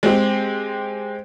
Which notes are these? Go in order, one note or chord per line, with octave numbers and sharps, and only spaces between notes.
G#3 C4 G4